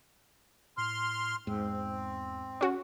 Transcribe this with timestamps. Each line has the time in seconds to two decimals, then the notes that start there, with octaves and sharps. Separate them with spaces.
0.78 A2 C6 F6
1.47 E2 G#2 C4
2.61 C#4 F#4